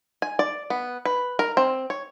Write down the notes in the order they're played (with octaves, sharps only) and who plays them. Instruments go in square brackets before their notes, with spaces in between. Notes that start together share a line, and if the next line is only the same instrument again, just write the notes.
[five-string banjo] G#5
D5
B3
B4
A#4
C4
C#5